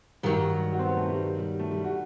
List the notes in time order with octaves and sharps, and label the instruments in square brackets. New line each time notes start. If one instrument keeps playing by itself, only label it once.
[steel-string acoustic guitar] G2 D#3 F#3 [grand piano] G4
[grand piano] F#4
C4
B3
A3
G3
G3
A3
G3
F#4